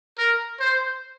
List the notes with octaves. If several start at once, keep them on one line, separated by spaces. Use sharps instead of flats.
A#4
C5